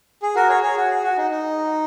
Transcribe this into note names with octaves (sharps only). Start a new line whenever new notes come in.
G#4
F#4 A#4
G#4 C#5
G#4 C#5
F#4
G#4
F#4
D#4
D#4